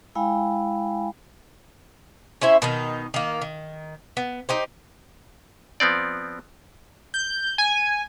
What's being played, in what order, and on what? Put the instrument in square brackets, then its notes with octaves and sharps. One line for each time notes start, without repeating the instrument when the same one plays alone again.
[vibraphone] G#3 E4 F5 G5 G#5 B5
[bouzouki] C#4 E4 C5 E5
B2 D#3 D#4
D#3 A#3
D#3
B3
D#4 G4 C5
[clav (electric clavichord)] F3 B3 C4 D5
[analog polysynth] G6
G#5